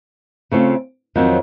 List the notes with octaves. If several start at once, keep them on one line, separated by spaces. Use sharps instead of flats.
C#3 A3 C4 F4
F2 D#3 F#3 C4